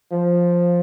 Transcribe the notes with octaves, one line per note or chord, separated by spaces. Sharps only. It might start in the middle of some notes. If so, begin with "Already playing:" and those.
F3